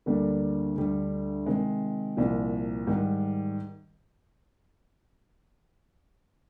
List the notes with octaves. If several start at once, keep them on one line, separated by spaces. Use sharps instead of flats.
D2 D3 G3 A#3 D4
D2 D3 G3
C3 D#3 G#3
C2 A#2 F3
G#2 D#3 G3